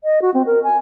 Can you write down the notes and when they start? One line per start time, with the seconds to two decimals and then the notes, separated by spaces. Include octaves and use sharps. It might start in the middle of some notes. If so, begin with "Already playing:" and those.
0.04 D#5
0.22 F#4
0.34 C4
0.46 A#4
0.63 G#5